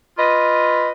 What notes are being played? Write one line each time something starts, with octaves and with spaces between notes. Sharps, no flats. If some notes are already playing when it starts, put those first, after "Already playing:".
F4 B4 D#5